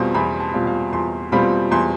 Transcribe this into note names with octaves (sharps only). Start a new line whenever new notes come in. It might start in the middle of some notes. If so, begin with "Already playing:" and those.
Already playing: E2 B2 G3 C4 F4 C6
E2 B5
A5
B2 G3 C4 F4
F5
E2 C6
B2 G3 C4 F4 B5
E2 C6